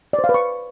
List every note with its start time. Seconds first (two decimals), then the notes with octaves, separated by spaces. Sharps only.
0.13 D5
0.19 C5
0.24 F5
0.29 B4
0.34 C#6